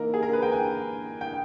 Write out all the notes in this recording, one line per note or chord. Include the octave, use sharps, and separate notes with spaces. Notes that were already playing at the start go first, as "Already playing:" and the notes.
Already playing: E3 A#3 D#4 A#4
G#4
A#4
B4
G5
G#5
G5